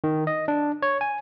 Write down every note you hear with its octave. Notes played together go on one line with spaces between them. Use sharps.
D#3
D#5
D4
C#5
G#5